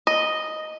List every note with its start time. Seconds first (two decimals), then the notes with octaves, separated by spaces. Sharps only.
0.07 D#5